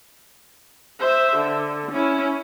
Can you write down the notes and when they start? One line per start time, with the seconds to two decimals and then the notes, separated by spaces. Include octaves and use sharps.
1.00 C5 E5
1.37 D3
1.92 C#4 E4